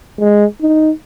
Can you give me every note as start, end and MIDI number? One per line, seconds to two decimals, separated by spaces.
0.20 0.45 56
0.61 0.91 63